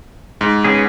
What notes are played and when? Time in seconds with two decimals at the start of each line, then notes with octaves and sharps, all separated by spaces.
0.41 G#2
0.64 B3 C#4 G#4